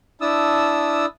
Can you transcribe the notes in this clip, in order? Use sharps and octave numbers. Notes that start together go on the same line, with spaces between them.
D4 E4 A5 D#6 E6